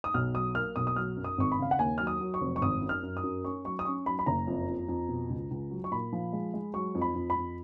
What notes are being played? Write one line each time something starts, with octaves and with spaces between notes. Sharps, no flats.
D#6
B1 F6
F#3 D#6
A#3 F6
B1 D#6
D#6
F#3 F6
F#2
D#6
G#1 C#6
B5
C#3 F5
F#5
D#2 G#5
F#3 F6
D#6
F#3
C#6
F1
C#6
G#1 D#6
F#2
F6
F#2
D#6
F#2
C#4 C#6
F#3 C#6
D#6
C#4 C#6
F#3 B5
B5
F#1 A#5
F2
F2
F2
B2
C#2
C#2
F#3
C#6
A#2 B5
F3
G#3
G#3
F#3 C#6
F2
B5
F2
B5
F2